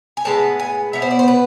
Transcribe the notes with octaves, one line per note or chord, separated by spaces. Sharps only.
G#5
A2 G#3 B3 A5
G#5
B2 B3 E5
C5
D5
C5
B4